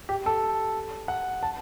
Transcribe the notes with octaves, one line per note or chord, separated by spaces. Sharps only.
G4
A4
F#5
A5